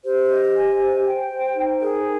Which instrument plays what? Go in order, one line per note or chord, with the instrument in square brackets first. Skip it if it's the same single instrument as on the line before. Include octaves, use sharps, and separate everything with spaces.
[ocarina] G4 [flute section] C5
[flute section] D#5
G#5
C5
G5
C5
D#4
[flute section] G#4 [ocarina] A#4